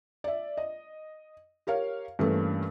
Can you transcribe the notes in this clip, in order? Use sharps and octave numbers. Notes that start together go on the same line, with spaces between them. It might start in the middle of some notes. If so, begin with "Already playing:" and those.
D5 E5
D#5
G4 A#4 C#5 F5
G2 E3 A3 A#3 C#4